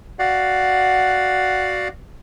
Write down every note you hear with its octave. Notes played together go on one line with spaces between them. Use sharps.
F#4 D5 F5 F#5